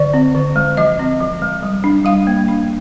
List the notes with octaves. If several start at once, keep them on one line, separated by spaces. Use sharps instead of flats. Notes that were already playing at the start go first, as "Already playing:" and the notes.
Already playing: D3 D5
C4
D3
G#3
F3 D#5
C4
F3
G#3
G3
D4
G3 F5
A#3
D4